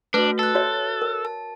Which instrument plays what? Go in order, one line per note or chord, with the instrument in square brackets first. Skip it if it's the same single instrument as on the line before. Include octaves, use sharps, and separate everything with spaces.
[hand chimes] A3 F#4 [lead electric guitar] D4 [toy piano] B4
[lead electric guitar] A4 [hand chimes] F#6 A6
[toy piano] F#4 C#5 E5
A#4
[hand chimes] A5